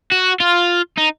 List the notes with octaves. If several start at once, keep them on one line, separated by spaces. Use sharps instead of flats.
F#4
F4
D#4